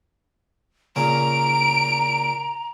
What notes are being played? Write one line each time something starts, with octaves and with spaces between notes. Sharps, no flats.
A#2 C#3 A#5 D7